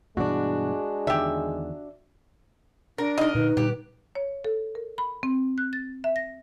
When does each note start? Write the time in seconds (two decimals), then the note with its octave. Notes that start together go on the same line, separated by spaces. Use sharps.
0.17 G2 B2 E3 G#3 D4 F#4
1.07 E2 D3 D#3 G4 E5
2.98 D4 A#4
3.18 D#4 A#4 D#5
3.35 A#2 D3 D#4 B4
3.57 A#2 D3 G3 G4
4.15 C#5
4.44 A4
4.75 A#4
4.98 B5
5.23 C4
5.58 F#6
5.73 A6
6.04 E5
6.16 A#6